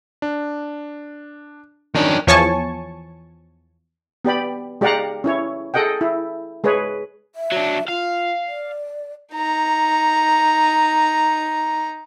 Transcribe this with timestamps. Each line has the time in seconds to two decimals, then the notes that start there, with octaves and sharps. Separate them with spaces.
0.22 D4
1.94 F2 D#3 C#4 D4
2.27 E2 F3 C#5 G#5 A5 C#6
4.25 B3 G4 D5 B5
4.81 G#3 G4 D5 F5 F#5 A#5
5.24 C#4 E4 C#5
5.74 G#4 A4 D#5 F#5 G5
6.01 E4
6.64 G#3 G#4 B4 C#5
7.35 E5
7.52 F#3 D4
7.88 F4 F5
8.47 D5
9.34 D#4 A#5